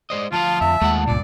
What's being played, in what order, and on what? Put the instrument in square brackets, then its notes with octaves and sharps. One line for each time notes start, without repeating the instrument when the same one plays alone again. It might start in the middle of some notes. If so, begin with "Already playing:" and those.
[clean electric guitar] G#3 C5 D#5 [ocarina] D5
[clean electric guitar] D2 F3 F5 [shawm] F4 [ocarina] A5
[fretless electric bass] F2 [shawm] E5
[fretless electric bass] D#2 G#3 [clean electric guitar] A3 F4 F#5
[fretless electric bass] C#2 A#2 [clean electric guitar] G2 [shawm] D5